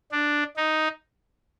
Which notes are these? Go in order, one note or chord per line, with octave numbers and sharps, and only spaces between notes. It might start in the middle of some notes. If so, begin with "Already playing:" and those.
D4
D#4